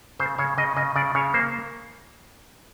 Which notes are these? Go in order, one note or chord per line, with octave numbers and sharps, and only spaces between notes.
C#3 C5
C#3 C#5
C#3 D#5
C#3 D#5
C#3 D5
C#3 C#5
A#3 C5